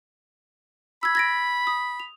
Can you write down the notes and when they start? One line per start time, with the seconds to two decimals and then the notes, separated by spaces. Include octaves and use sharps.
1.03 B5 E6 G#6
1.15 G#6 A#6 D7
1.67 D#6
2.00 F7